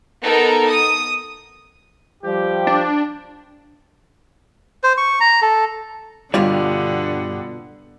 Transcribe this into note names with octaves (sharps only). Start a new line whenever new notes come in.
B3 D#4 A4 A#4 A#5
D#6
F3 G3 G4
D4
C5
C#6
A#5
A4
G2 B2 D3 G3 B3 F4 C#5